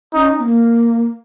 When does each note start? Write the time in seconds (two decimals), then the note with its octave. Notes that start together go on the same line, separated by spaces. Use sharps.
0.14 C#4 D#4
0.39 B3
0.45 A#3